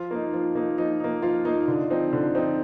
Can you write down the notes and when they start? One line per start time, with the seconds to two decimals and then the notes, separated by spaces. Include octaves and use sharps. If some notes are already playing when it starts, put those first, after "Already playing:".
Already playing: F3 F4
0.11 A#3 D#4
0.33 F3
0.55 A#3 D#4
0.78 F3 D#4
1.00 A#3 D#4
1.22 F3 F4
1.45 A#3 D#4
1.67 D3
1.90 F3 C4 D#4
2.13 D3
2.35 F3 C4 D#4